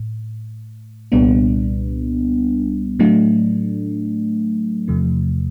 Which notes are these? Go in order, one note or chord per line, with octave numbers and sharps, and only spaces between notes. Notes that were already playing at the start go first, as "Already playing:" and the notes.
Already playing: A2
C2 A#2 G3 B3 D4
A2 F#3 A3 D4
E2 C3 F3 A3